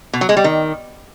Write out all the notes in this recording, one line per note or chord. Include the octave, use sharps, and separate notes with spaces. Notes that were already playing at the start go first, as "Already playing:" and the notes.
B2
F#3
G#3
G3
D#3